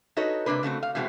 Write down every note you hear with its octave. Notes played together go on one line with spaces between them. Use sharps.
D#4 F#4 A4 B4 C#5 D#5
C3 G#3 A#3 D4 B4
C#3 A3 C4 F#4
F5
B2 E3 G#3 A3 C4 F#4